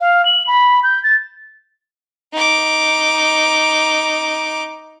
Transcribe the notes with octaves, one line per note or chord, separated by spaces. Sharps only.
F5
F#7
B5
G6
A6
D#4 D6